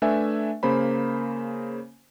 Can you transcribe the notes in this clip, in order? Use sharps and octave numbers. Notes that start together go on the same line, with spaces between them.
A3 D4 B4 E5 G#5
C#3 A#3 C5 B5